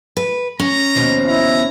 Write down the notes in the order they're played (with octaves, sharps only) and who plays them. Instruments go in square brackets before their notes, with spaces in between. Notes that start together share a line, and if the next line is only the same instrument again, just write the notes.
[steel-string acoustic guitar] B4
[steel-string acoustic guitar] C#4 [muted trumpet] A#5
[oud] D#2 B2 F3
[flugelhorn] E4 [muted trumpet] A#5